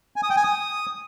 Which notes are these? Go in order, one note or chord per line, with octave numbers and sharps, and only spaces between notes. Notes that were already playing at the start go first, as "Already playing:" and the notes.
G#5
D#6
G5
G#5
D#6